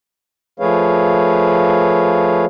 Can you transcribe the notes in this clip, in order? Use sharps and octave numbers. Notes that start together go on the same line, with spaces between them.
F3 A3 G#4 B4 C#5 F5